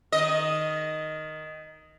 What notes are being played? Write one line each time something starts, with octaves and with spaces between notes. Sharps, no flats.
D#3 D#5